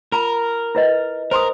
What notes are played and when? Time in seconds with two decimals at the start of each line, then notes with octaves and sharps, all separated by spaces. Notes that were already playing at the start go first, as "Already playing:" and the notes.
0.12 F4 A#4 A#5
0.75 E4 B4 D#5
1.31 A#4 C5 C6 D#6